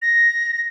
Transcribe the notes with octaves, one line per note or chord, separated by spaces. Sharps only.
A#6